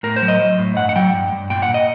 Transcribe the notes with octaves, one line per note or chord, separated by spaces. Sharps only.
A2 A#4
C5
F#3
D#5
F#3
A2
G2 F#5
F#5
F#3 G5
G2
G2
A#2 G5
F#5
A#2
D#5